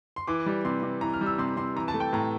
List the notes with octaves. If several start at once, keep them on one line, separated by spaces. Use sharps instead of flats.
C6
E3 D6
G3
C3 C6
C3
E3 A#5
F6
G3
E6
C3 C6
C3 C6
E3 A#5
A5
A3
G5
A2 A#5